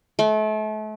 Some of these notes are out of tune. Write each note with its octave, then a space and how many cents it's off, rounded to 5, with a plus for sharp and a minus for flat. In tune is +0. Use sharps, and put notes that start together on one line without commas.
A3 -35